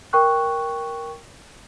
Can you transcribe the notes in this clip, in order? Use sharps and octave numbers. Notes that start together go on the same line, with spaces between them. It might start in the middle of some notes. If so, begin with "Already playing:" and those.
A#4 G5 C#6 F#6